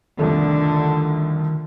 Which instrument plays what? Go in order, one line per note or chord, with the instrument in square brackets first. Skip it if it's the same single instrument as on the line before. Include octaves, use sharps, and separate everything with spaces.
[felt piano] C2 F2 A3 [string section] D3 [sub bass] D#3